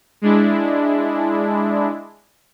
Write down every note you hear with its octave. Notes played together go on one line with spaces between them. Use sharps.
G#3 D4 E4